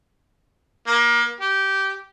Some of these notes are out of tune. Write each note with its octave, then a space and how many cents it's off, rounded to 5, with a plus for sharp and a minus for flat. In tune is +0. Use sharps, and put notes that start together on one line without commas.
A#3 +30
G4 -15